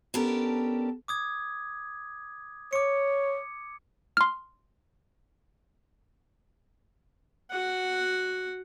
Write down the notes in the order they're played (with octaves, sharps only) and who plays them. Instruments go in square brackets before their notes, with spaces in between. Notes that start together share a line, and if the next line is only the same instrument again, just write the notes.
[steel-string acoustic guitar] B3 C#4 D4 G4 A4 A#4
[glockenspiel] D6 D#6 G#6
[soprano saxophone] C#5 [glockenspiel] D6 C#7
[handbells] C6 F6
[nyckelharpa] F#4 F#5